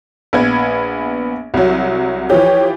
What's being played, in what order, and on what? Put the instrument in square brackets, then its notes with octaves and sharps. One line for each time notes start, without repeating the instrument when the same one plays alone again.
[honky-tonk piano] A#1 B3 G#6
C2 F#3
[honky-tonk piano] E3 F3 G4 [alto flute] C#5